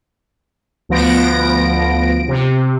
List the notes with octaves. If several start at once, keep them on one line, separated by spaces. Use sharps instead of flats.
D2 F3 B3 A#6 D7
C3